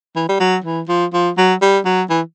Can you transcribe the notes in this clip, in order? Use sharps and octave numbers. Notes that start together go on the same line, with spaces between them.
E3
G3
F#3
E3
F3
F3
F#3
G3
F#3
E3